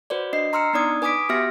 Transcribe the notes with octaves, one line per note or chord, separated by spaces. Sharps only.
F#4 B4 C5 D5
D4 D#5 C7
A#5 C6 E6 F6 C7 C#7
B3 D4 D#4 D5 D#6 G#6
B4 G#5 D6 D#6 B6 D7
B3 F#4 G4 E5 F6 A#6